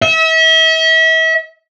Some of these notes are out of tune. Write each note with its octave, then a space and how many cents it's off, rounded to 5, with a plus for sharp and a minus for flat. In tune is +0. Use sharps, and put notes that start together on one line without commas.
E5 -35